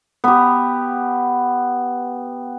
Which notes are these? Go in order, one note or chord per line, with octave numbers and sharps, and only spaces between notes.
B3 G4